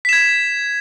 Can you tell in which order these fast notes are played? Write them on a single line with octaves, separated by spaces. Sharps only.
B6 E7 G#6